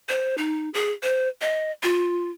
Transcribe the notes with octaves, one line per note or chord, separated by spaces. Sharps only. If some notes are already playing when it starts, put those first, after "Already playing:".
C5
D#4
G#4
C5
D#5
F4